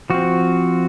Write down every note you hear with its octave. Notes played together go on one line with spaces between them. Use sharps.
F3 C4 F#4